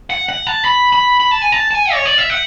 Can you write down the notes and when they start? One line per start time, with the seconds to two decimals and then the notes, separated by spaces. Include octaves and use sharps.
0.10 F#5
0.29 F#5
0.47 A5
0.65 B5
0.93 B5
1.20 B5
1.31 A5
1.42 G#5
1.52 A5
1.71 A5
1.75 G#5
1.93 C#5
2.05 D5
2.18 E5
2.30 F#5